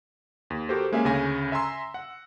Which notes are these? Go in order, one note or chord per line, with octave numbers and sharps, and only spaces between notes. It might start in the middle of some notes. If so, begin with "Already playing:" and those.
D#2
F#4 G4 A4 A#4 C5
G#3 A#3 C#4 E5 F5 G#5
D2 C#3 C#4 G#5 A#6
E5 G#5 A#5 C6 E6
F#5